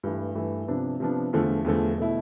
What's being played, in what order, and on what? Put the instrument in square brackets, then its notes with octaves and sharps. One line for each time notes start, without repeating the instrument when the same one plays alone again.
[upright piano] G2 E3 A3
G2 E3 A3
C3 F3 B3 D4
C3 F3 B3 D4
E2 D3 F3 A3
E2 D3 F3 A3
B2 A3 E4